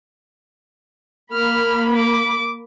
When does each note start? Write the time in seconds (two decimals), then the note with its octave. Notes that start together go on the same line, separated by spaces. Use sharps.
1.33 A#3 B5 F6
1.96 D6